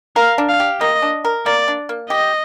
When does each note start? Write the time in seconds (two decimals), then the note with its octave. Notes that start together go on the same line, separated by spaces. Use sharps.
0.16 A#4 F5
0.38 D4
0.49 F5
0.60 G4
0.81 A#3 D#5
1.02 D4
1.25 A#4
1.46 A#3 D5
1.68 D4
1.89 A#3
2.10 G4 D#5